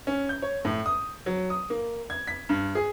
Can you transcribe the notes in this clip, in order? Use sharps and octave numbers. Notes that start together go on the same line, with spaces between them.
C#4
G6
C#5
A2
D#6
F#3
D#6
A#3
G#6
B6
G2
G#4